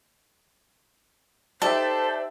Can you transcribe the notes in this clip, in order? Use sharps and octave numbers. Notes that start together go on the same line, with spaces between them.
D#4 G4 A4 C5 D5 E5